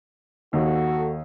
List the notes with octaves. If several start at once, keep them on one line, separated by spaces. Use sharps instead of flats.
D#2 F#4 A4